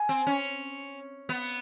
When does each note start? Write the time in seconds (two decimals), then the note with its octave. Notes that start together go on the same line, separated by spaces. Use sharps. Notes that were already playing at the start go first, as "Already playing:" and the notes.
Already playing: G#5
0.09 C4
0.27 C#4
1.29 B3